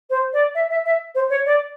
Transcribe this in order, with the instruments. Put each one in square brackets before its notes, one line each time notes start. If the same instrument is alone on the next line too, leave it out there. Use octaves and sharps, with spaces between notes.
[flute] C5
D5
E5
E5
E5
C5
C#5
D5